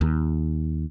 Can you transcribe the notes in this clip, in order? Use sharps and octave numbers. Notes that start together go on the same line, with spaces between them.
D#2